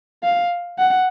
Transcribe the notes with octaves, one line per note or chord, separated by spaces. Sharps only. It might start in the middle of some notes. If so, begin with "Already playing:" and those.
F5
F#5